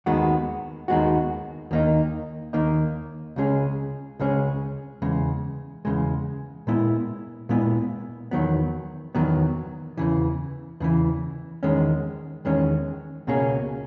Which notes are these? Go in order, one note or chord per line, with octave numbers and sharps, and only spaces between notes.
D#2 D#3 G#3 B3 F#4
D#2 D#3 G#3 B3 F#4
D#2 D#3 A#3 D#4
D#2 D#3 A#3 D#4
C#2 C#3 G#3 C#4 G#4
C#2 C#3 G#3 C#4 G#4
E2 C#3 G#3
E2 C#3 G#3
A#2 G#3 B3 E4
A#2 G#3 B3 E4
E2 D#3 F#3 B3
E2 D#3 F#3 B3
E2 C#3 E3
E2 C#3 E3
E2 D#3 G#3 C#4
E2 D#3 G#3 C#4
C#2 B2 A#3 C#4 G#4